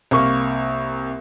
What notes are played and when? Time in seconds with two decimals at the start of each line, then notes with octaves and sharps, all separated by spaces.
0.11 C2 A#3 C#6